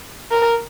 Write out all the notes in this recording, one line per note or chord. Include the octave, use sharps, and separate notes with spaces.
A#4